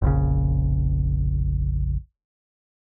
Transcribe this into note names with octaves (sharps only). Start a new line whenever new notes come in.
F1 A#1 C#3